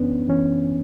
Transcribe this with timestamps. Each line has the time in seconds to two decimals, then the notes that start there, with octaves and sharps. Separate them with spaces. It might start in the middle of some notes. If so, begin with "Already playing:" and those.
Already playing: F#2 E3 B3 C#4 D4
0.29 E3 C#4